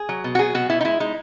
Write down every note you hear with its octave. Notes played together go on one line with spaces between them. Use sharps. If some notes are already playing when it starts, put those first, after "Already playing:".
Already playing: G#4
F#3
B2
F#4
F#3 G#4
B2 F#4
B2 E4
D#4
G#3 E4
G#3 D#4